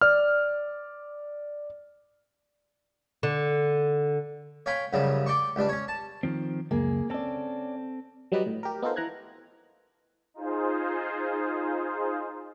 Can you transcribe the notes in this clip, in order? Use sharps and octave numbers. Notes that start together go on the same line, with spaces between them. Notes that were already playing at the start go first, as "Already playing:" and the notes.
D5 F6
D3
C#5 F5 G5 G#5 B5 C6
F#2 C#3 F3 G3
D5 G5 C6 C#6
C#2 G3 D4
C#4 C#5
A5
D#3 F3 C4
C#2 F#2 A#3 G#4
C4 C#4 A4 D5
F#3 G3 D#4 B4 D5 D#5
A2
G4 A#4
B3 D#4 F4 A4 A#4 C5
E3 A#5 F#6 G#6
D#4 F4 G#4 C5